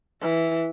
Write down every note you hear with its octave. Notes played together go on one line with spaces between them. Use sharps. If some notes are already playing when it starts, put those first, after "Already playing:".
E3